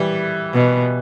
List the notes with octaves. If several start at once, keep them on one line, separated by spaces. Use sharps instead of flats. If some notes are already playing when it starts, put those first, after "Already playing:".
Already playing: E3 G3
B2